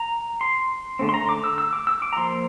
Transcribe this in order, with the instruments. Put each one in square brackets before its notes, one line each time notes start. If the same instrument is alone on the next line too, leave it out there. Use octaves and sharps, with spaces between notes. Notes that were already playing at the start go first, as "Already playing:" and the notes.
Already playing: [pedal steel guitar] A#5
C6
D3 A3 C4
C6
A#5
D6
E6
E6
D6
E6
D6
A#5
F3 A#3 C6